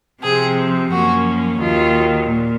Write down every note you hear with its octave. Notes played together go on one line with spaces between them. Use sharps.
C3 F3 C4 G#4
F#2 F3 A#3 C#4 F#4
D#2 D#3 F#3 F4
A#2